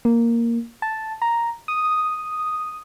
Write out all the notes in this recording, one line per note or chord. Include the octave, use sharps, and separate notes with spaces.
A#3
A5
A#5
D#6